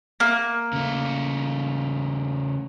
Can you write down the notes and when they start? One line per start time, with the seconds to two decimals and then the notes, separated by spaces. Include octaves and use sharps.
0.20 A#3
0.73 C#3 A3